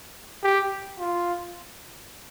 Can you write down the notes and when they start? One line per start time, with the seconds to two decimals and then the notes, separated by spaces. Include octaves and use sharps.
0.43 G4
1.00 F4